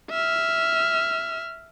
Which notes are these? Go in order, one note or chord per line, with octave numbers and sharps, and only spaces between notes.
E5 F6